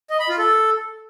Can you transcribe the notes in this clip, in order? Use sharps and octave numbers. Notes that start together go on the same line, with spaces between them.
D#5
B5
F4
A4